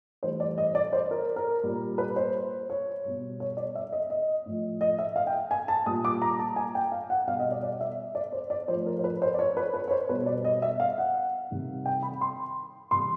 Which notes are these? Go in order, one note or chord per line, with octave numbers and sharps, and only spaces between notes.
A2 E3 G3 C5
D5
D#5
D5
C5
A#4
A#4
A#2 G3
B4
C5
C#5
B2 G3
C#5
D5
E5
D#5
D#5
A2 F3
D#5
E5
F5
G5
G#5
A5
A#2 G3 D#6
D6
A#5
A5
G#5
G5
F5
F#5
B2 G3 F5
D#5
D5
D5
E5
D5
C5
D5
A2 F3 C5
A#4
C5
B4
C5
D5
C#5
B4
B4
C#5
C5
B2 G3 B4
D5
D#5
E5
F5
F#5
C3 D#3 G3
G5
B5
C6
C3 E3 G3 C6